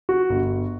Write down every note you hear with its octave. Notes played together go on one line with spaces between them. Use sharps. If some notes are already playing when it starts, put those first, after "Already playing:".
F#4
G1